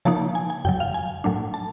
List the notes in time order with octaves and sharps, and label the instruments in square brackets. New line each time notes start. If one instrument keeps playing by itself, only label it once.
[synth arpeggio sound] C#3 F3 A#3 D#4 A5
G#5
G#5
F#2 C#3 F#3 G5
F5
G#5
A2 F#3 A3 D4
A5